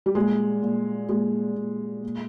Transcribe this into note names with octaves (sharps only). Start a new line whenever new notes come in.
G3
A#2 G#3
A#2
A#2 G#3
A#2
A#2